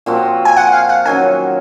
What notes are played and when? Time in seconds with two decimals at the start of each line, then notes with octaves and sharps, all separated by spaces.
0.06 A#2 F3 C4 F#4
0.45 G#5
0.56 F#5
0.72 F5
0.89 F#5
1.05 D#3 F#3 C#4 G#5